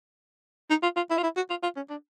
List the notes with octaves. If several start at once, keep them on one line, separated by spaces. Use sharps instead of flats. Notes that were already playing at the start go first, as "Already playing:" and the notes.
D#4
F4
F4
E4
F4
E4
F#4
F4
F4
C#4
D4